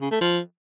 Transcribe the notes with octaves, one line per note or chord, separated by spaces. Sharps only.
C#3
A3
F3